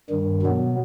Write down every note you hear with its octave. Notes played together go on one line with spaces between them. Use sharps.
G2 D#3 G3
B2 F#3 B3